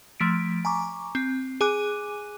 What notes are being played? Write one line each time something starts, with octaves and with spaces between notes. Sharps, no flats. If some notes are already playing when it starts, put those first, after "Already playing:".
F3 A3 B6 D7
G#5 A#5 C#6 D6
C4
G#4 G#5 D6 F#6 D#7